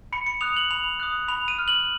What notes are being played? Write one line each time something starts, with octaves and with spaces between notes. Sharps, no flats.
B5 C#7
C#7
D#6 F#6 F7
F#7
B5 F7
D#6 F#6
B5 F7
D#7
F6
F#7